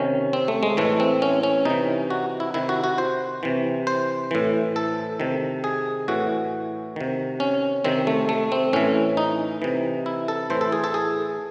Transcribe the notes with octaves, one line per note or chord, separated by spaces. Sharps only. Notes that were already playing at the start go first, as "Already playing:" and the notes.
Already playing: C3 D#3 C#4
C4
A3
G#3
A2 E3 A3
C4
C#4
C#4
C3 E3 D#4
F#4
E4
C3 D#3 E4
F#4
F#4
C5
C3 E3
C5
A2 E3
A4
C3 D#3
G#4
A2 E3 F#4
C3 D#3
C#4
C3 D#3 C4
A3
A3
C4
A2 E3 C#4
D#4
C3 E3
E4
A4
A2 E3 C5
A4
G#4
A4
G#4